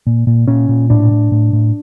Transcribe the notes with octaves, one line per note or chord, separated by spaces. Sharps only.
A#2
A#2
A#2 C#4
A#2
A2 D4
A2
A2
A2